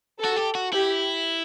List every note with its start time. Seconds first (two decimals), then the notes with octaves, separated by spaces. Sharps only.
0.19 A4
0.25 F#4
0.36 G4
0.55 F#4
0.73 E4 G4